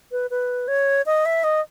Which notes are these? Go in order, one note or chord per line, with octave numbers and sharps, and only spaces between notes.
B4
B4
C#5
D#5
E5
D#5